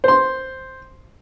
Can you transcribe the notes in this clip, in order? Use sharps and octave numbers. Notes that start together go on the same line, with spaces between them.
C5 C6